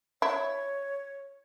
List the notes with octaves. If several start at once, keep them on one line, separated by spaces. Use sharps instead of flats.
E4 C#5